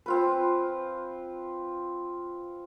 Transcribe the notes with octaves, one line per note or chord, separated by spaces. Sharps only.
C4 F4 B4